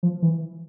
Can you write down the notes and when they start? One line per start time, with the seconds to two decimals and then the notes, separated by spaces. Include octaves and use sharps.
0.03 F3
0.22 E3